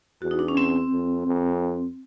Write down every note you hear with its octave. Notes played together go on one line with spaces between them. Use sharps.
E2 F#4
D#4
D4
C#4
C4
F2
F2